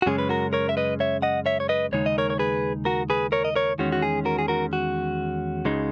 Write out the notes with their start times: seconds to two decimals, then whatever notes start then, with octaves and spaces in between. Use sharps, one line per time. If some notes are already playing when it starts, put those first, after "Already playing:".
0.02 F#4
0.06 F#2 C#3 G#3 C#4 G#4
0.18 B4
0.29 F#4 A#4
0.53 A#4 C#5
0.69 E5
0.77 B4 D#5
1.00 C#5 E5
1.22 D#5 F#5
1.46 C#5 E5
1.60 C#5
1.69 B4 D#5
1.92 D#2 C#3 G#3 D#4 C#5
2.06 D#5
2.18 A#4 C#5
2.30 C#5
2.39 G#4 B4
2.85 F#4 A#4
3.10 G#4 B4
3.32 A#4 C#5
3.45 D#5
3.55 A#4 C#5
3.78 E2 D#3 G#3 C#4 F#4
3.92 F#4
4.02 G#4
4.25 F#4 A#4
4.39 G#4
4.48 F#4 A#4
4.73 F#4
5.65 C#2 C#3 G#3 D#4